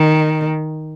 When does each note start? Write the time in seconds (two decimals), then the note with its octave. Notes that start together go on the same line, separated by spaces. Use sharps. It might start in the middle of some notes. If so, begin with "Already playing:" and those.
Already playing: D#3